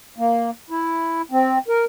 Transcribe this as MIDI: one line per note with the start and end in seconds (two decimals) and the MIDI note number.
0.18 0.50 58
0.70 1.22 64
1.31 1.58 60
1.68 1.85 70